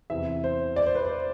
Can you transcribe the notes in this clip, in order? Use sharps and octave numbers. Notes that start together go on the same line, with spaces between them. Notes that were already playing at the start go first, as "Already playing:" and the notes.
E2 C3 E3 E5
C5
D5
C5
B4
C5